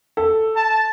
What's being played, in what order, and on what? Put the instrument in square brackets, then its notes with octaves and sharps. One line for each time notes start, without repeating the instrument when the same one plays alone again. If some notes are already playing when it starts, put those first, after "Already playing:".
[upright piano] A4
[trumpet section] A5